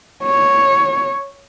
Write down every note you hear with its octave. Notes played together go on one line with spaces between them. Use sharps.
C#5